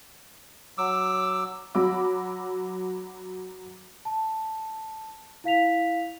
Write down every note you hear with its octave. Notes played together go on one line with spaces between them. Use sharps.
F#3 D6 E6
F#3 F#4 B5 D6 E6
A5
E4 F5 B6 F7